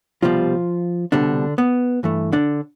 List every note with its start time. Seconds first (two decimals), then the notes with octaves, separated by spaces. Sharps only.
0.22 C2 B2 F3 G3 F4
1.12 C2 B2 D3 G3 D4
1.58 B3
2.03 G2 E3 A3
2.33 D3 D4